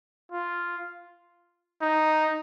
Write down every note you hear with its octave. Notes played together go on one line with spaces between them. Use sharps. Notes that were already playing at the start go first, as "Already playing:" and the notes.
F4
D#4